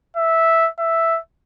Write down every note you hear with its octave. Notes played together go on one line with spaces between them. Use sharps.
E5
E5